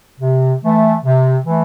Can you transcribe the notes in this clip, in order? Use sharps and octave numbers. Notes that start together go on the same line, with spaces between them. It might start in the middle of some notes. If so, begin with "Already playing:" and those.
C3
E3 A3
C3
E3 A3